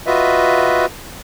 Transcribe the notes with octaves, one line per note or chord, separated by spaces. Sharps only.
F4 F#4 B4 D#5 E5